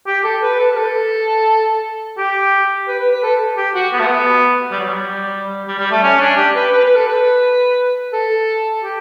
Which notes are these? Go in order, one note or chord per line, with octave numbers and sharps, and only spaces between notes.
G4
A4
B4
A4
B4
A4
G4
B4
B4
B4
A4
G4
F#4
B3
A3
B3
G3
F#3
G3
G3
G3
A3
C#4
D4
G4
B4
B4
B4
A4
B4
A4
G4